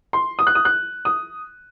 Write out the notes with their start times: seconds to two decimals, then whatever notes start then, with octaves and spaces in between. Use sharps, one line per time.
0.13 C6
0.39 D#6
0.47 F#6
0.55 D#6
0.65 F#6
1.05 D#6